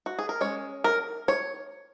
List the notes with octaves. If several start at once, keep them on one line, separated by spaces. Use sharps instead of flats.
F#4
G#4
A#4
G#3 C#4 C#5
A#4
C#5